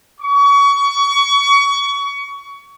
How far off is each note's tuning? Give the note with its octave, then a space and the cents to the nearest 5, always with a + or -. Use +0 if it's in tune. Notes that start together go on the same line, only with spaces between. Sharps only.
C#6 +25